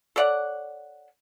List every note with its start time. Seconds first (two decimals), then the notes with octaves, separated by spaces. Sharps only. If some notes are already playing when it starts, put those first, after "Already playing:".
0.16 A4 C#5 D5 F#5